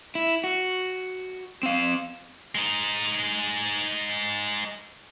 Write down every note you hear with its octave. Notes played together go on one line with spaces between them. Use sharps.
E4
F#4
C4 F5
G#3 D#4